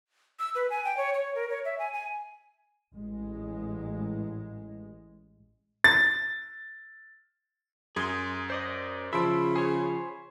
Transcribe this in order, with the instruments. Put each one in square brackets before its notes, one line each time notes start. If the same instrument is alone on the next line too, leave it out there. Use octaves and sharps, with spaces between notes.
[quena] E6
B4
G#5
G5
C#5
C#5
A#4
C#5
E5
G#5
G#5
[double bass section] A1 G#3
[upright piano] A6
[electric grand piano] F#2 D#6 G#6 [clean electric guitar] G#4 C6
[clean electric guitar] C5 D5 D#5
[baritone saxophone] C#3 [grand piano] F3 [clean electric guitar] E5 [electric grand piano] B5 C6 D7
[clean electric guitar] G#4 C5 C#5